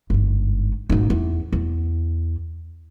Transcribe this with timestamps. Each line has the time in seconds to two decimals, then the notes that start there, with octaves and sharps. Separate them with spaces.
0.10 G1 G#2
0.90 G#1 D#4
1.10 E2
1.53 E2